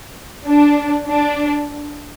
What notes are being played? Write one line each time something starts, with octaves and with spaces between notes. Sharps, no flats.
D4
D4